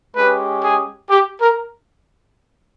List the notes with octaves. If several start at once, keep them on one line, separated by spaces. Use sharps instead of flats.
G#3 C#4 G4 B4
G#4
G4
A#4